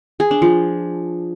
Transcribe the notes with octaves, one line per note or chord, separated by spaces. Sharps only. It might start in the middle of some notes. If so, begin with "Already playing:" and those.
G#4
D4
F3